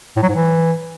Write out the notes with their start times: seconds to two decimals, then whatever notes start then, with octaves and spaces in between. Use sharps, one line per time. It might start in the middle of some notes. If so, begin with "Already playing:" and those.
0.16 A2
0.23 F#3
0.29 G#2
0.35 E3